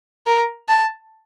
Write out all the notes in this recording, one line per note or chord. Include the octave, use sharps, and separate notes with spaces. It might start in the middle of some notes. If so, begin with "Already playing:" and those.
A#4
A5